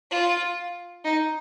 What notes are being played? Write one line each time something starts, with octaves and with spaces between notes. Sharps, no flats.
F4
D#4